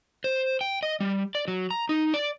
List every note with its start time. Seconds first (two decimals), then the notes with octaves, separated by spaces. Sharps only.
0.24 C5
0.61 G5
0.83 D#5
1.00 G3
1.35 D5
1.48 F#3
1.71 A#5
1.89 D#4
2.14 D5